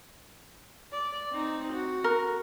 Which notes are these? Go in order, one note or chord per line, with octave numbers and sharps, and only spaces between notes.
D5
C4 D#4
F#4
A#4